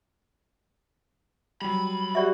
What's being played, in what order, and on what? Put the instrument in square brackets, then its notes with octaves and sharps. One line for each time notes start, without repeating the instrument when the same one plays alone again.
[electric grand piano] F#3 G3 [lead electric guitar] B5
[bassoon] F#4 [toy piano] G4 D5 E5